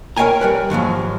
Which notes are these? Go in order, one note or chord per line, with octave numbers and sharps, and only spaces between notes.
A#4 C#5 F5 G5 G#5 A#5
G3 A#4 B4
D#2 G#2 F3 F#3